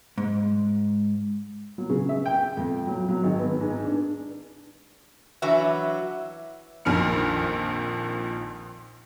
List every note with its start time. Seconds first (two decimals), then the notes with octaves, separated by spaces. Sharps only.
0.18 G#2
1.78 F#3
1.89 C#3
2.09 E5
2.26 G5
2.57 F2
2.87 F#3
3.09 F#3
3.23 G#1
3.39 B3
3.61 G#2
3.85 D4
5.42 E3 F#3 D4 F#4 B4 E5
6.85 A#1 F2 A#2 D#3 F6 C#7